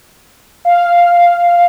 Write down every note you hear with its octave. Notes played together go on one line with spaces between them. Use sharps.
F5